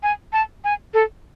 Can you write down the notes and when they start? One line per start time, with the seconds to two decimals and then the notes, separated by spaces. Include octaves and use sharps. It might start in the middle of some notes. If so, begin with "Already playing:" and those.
0.03 G#5
0.33 A5
0.64 G#5
0.94 A4